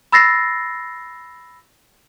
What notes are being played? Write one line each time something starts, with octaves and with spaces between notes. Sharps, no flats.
B5 E6 A6 A#6 C7